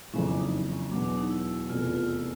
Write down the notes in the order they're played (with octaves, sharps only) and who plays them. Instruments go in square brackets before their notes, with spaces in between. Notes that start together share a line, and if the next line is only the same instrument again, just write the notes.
[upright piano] F#1 F2 C#3 E3 [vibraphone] C#4
[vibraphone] D4
D#4
C#4
[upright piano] E2 B2 F#3 [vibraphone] D4
[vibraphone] D4
D#4
E4
[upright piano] F1 E2 B2 [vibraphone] F4
[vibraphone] F4
F4
E4